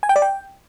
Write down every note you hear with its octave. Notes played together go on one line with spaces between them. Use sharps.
G#5
G5
D5
G5